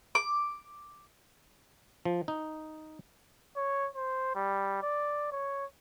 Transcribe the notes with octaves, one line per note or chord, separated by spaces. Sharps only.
D6
F3
D#4
C#5
C5
G3
D5
C#5